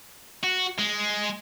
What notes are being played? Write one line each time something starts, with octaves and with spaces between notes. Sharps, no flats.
F#4
G#3